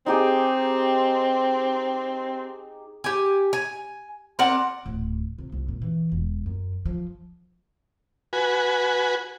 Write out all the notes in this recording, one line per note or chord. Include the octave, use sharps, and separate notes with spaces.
C4 D#4 G4 G#4
G4 G#5
G#5
C4 A#4 D5 F#5
D1
C3
C2
A#2
E3
E1
F#2
F3
F#4 B4 G#5